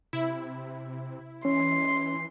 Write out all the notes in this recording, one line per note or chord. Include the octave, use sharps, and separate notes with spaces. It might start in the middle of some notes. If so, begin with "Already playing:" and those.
C3 E4
E3 C#4 C6